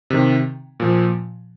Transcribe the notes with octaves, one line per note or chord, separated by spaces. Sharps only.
C3 D#3
A#2 F3